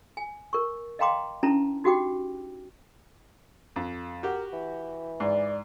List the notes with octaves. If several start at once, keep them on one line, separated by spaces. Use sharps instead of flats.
G#5
A#4 C#6
D#5 F5 G5 A#5 C6 D6
C#4 D4 E4 B4 A5 A#5
D#4 F#4 G4 F#5 G5 D6
F2
F#4 G4 A#4
E3
G#2 D5